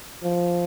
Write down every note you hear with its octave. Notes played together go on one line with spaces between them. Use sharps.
F3